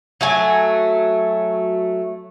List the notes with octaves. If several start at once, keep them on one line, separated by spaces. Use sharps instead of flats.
F#3 A3 G#5